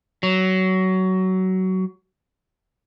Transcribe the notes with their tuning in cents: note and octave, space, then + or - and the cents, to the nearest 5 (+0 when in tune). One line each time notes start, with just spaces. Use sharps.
F#3 +20